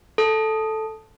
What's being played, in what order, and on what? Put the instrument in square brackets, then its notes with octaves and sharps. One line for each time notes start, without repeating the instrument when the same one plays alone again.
[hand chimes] A4